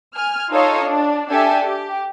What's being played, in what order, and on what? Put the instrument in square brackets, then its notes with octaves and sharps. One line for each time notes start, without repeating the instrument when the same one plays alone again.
[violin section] G#5 F6
D#4 F4 A4 C#5 D#5 F5
D4
D4 G4 A4 E5 G5 G#5
G4